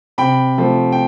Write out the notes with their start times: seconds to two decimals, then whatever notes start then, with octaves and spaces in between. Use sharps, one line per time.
0.18 C3 G5 B5
0.58 F3 A3
0.92 G5